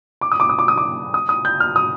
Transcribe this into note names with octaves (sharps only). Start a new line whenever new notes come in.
D6
D#6
D6
D#6
D6
D#6
D6
D#6
D#6
G6
F6
D#6